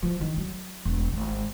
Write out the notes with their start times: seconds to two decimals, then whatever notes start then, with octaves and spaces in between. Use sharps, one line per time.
0.03 F3
0.21 D#3
0.37 F#3
0.85 E1
1.13 G#1